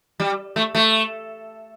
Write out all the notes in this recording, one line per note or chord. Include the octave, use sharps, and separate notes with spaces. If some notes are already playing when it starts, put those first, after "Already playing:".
G3
A3
A3